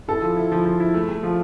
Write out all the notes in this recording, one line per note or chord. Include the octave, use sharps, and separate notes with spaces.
E4 A4
F3
E4
F3
F3
E4
A3
A3
F3